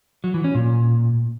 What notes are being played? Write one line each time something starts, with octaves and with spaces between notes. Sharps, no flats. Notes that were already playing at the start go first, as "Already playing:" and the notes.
F#3
E3
C#4
A#2